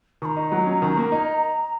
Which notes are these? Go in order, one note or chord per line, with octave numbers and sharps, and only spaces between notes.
D#3 A#5 C#6
D#4
F#3
C#4
D#3
A#3
D#4